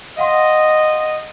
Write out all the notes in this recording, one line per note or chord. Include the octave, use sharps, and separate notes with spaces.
D#5 F5 F#5 C6